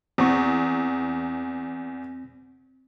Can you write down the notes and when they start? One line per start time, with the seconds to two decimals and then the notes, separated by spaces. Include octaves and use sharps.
0.18 E2 C4 C#6